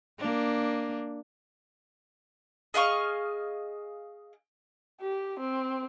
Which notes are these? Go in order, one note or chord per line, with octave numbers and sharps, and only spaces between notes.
A#3 D4
G#4 D#5 F5 C#6
G4
C4